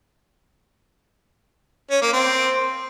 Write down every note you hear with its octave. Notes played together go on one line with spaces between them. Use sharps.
C#4
A#3
C4